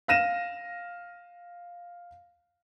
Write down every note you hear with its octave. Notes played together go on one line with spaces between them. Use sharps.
F5 F6 A#6 D#7 E7